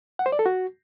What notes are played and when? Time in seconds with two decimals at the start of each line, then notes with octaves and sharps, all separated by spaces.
0.19 F#5
0.26 C5
0.32 D5
0.39 A4
0.46 F#4